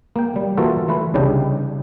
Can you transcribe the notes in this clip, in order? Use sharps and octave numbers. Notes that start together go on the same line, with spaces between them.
A#3 G5
G3
E3 A#3 F4 F#4 A4
E3 A3 B4
C2 C#3 D4 D#4 G4